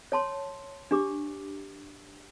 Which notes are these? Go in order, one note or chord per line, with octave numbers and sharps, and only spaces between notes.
C#5 A5 C6
D4 G4 D6